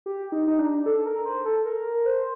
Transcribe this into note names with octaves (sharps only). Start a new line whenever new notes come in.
G4
D#4
D#4
D4
A4
A#4
C5
A4
A#4
C5